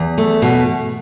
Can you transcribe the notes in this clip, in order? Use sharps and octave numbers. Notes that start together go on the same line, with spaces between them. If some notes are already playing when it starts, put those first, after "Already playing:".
Already playing: E2
A3
B2